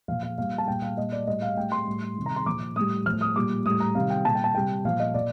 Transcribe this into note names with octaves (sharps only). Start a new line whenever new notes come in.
A#2 F3 F5
F5
A#2 G3 F5
A5
A#2 G3 G5
F5
A#2 G3 D#5
D5
A2 G3 D#5
F5
A2 G3 G5
C6
A2 G3
C3 D#3 G3
A#5
C6
A#2 F3 D6
A2 G3 D#6
A2 F3 F6
D#6
A#2 G3 D6
A2 G3 D#6
A#5
C3 D#3 G3 F5
G5
A#2 G3 A5
G5
A5
C3 G3 G5
A#2 F3 F5
D#5
A#2 D5